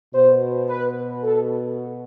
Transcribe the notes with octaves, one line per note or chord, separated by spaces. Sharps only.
B2 C5
B4
A4